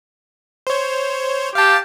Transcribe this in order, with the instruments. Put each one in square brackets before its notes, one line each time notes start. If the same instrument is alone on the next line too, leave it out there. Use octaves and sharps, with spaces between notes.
[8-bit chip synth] C5 C#5
[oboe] G4 [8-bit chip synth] F5 A5